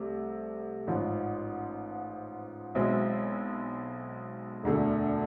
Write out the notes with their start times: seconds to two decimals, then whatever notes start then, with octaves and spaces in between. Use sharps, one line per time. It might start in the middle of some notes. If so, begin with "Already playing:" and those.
Already playing: C2 C3 A3
0.87 A1 G#2 F3
2.75 B1 B2 G#3 C4 E4
4.63 E1 D2 D3 A3